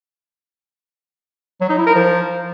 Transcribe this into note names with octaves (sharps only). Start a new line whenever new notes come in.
F#3
D#4
E4
A#4
F3